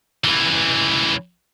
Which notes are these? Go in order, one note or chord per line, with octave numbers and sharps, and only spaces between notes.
C#2 E3